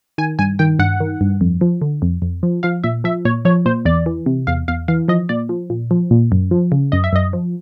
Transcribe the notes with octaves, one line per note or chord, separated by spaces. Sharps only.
D#3 G#5
G2 G#5
D#3 G5
G2 F#5
D#3
G2
F2
F3
D3
F2
F2
F3
F3 F5
A#2 E5
F3 E5
A#2 C#5
F3 C#5
A#2 C5
E2 D5
E3
C3
E2 F5
E2 F5
E3 F5
F3 D#5
A#2 D5
F3
A#2
F3
A#2
F#2
F3
C#3
F#2 D#5
E5
F#2 D#5
F3